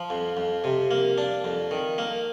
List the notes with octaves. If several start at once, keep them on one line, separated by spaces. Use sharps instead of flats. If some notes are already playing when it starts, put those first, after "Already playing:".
Already playing: F3
F2
F2
C3
A#3
D4
F2
D#3
A#3